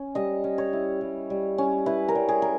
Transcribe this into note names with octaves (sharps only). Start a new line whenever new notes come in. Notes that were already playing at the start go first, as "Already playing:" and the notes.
Already playing: C#4
G3 D#5
C#4
C#5
E4
G3
G3
C#4
E4 B4
A#4
G3
G#4
A#4